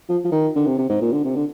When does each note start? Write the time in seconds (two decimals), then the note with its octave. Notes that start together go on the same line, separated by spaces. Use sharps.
0.09 F3
0.24 F3
0.32 D#3
0.55 D3
0.67 C3
0.78 C3
0.89 G#2
1.01 A#2
1.13 D3
1.25 C3
1.36 D3